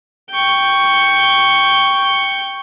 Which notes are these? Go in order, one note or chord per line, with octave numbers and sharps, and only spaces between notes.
G5 C#6